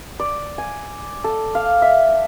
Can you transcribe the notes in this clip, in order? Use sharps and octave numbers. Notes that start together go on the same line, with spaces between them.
D5
G#5
A4
F5
E5